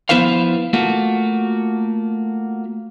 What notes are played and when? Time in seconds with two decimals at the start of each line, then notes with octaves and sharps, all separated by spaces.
0.09 F3 B3 E4 B4 C5 F5
0.73 A3 A#3 F4 F#4